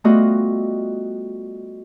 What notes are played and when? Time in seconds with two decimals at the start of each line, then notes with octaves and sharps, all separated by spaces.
0.04 G3 A3 B3 F4 F#4 D#5